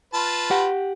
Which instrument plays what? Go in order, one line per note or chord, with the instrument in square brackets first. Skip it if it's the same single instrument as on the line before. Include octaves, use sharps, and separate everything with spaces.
[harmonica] F4 B4 A5
[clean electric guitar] G4 F#5